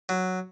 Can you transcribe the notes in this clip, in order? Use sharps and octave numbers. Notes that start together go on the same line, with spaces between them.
F#3